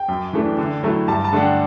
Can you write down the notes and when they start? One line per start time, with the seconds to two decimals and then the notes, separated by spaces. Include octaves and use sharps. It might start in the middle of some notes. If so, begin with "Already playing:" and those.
Already playing: G5
0.08 F#2
0.33 E3 A3 D4
0.58 D3
0.83 F#3 A3 E4
1.08 G2 A5
1.25 A5
1.32 D3 A3 D4 F#5
1.41 G5